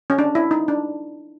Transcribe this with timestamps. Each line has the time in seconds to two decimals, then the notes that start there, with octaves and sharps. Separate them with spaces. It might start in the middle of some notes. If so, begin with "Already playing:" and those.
0.10 C#4
0.19 D4
0.35 E4
0.51 D#4
0.68 D4